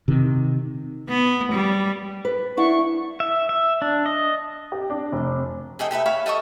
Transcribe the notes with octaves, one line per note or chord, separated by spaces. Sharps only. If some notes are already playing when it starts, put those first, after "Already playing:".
C3 D#3
B3
G3
B4
D4 E4 F#5 C#6
E5
E5
D4
D#5
G4
D4
F1
G#4 A4 D#5 G5
G4 A4 B4 E5
C#5 E5 F5 B5
A4 D#5 E5 C#6